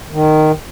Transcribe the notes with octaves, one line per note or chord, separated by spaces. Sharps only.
D#3